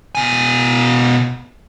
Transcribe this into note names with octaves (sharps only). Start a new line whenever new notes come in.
B2 G#5